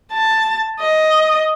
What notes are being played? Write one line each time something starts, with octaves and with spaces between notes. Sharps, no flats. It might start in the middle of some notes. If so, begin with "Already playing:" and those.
A5
D#5